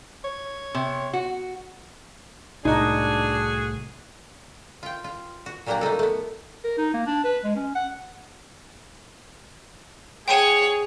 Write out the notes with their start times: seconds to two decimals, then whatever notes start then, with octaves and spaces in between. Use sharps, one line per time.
0.24 C#5
0.75 C3
1.13 F#4
2.65 C2 A2 D4 D#4 F#4 G#4
4.83 F4 G5
5.04 F4
5.46 F#4
5.66 A#2 F#3 G3 A#3 D4 A#5
5.81 A3 A#3 D#4 A4
5.99 A3 B3
6.64 A#4
6.78 D#4
6.94 A#3
7.06 D4
7.24 B4
7.44 G#3
7.56 C#4
7.75 F#5
10.28 G#4 C#5 F#5 G5 D#7